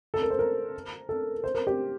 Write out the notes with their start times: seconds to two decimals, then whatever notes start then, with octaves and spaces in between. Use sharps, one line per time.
0.14 A4
0.22 A#4
0.30 C5
0.39 A#4
1.09 A4
1.44 C5
1.54 A#4
1.67 G4